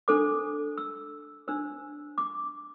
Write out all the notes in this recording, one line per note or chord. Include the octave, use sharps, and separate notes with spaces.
D4 A4 C5 D6
E6
D4 C5 E6
D6